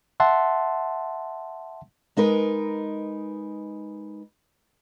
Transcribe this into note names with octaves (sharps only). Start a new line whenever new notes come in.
E5 F#5 A5 C6
G#3 D#4 A#4 B4